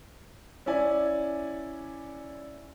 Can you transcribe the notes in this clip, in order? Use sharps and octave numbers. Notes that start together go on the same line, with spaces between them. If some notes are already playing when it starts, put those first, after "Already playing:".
C#4 E4 D5 G#5